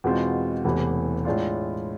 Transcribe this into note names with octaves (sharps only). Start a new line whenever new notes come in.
E2 B2 G#3 C4 F4
E1 E2 C3 E3 A3
A2 G#3 D4 F4